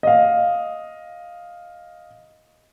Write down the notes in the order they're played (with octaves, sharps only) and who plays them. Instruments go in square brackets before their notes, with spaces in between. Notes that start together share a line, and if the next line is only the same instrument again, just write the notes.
[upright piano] D#5 F5